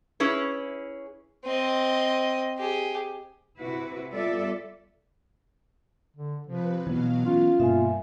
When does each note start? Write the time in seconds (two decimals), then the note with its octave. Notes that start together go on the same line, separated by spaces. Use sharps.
0.20 C#4 E4 G#4 B4
1.45 C4 D#5
2.59 G4 G#4
3.58 C3 E4 F#4 B4
4.11 G3 B3 F4 A4 D5 E5
6.17 D3
6.47 C3 F3 B4
6.87 B2 E3 F#3 B3 F5
7.25 C#4 F4
7.60 G2 B2 A#3 E5 G#5